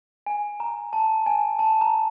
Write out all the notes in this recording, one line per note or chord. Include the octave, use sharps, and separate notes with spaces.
G#5
A#5
A5
G#5
A5
A#5